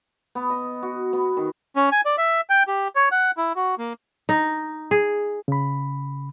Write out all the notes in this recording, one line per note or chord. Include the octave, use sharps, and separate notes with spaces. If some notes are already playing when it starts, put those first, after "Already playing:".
B3
D#5
F#4
B3
D#3
C#4
G#5
D5
E5
G5
G4
C#5
F#5
E4
F#4
A#3
D#4
G#4
C#3 B5